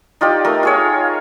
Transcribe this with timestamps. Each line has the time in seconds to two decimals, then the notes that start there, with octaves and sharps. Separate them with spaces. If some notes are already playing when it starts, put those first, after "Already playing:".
0.21 D#4 F4 G4 D5
0.45 A3 D#4 A#4
0.63 F4 G#4 C#5